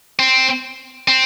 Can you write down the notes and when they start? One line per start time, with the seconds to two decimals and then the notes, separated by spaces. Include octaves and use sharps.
0.19 C4
1.08 C4